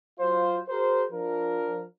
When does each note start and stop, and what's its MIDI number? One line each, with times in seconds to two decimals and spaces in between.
0.20 0.59 54
0.20 0.59 65
0.20 0.59 72
0.68 1.04 66
0.68 1.04 68
0.68 1.04 70
0.68 1.04 72
1.12 1.83 53
1.12 1.83 62
1.12 1.83 70